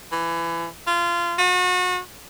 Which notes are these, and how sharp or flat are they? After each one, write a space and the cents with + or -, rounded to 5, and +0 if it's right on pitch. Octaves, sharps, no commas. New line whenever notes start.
E3 +25
F4 -25
F#4 -35